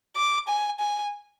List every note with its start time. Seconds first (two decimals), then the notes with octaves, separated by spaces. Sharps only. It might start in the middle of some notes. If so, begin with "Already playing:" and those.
0.17 D6
0.48 G#5
0.80 G#5